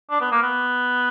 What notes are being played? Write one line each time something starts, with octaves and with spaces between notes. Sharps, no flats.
D4
B3
A#3
B3